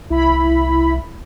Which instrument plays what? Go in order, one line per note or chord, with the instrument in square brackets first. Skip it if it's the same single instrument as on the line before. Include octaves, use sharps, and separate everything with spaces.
[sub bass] C2 [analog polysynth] E4 B5